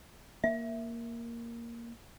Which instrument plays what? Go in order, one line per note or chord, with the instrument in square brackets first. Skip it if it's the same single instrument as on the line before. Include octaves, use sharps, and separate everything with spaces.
[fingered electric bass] A#3 [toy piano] E5